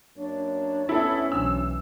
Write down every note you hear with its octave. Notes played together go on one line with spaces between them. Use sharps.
F#2 A#3 D4 C#5
D2 B3 C#4 E4 A4
B1 E3 E6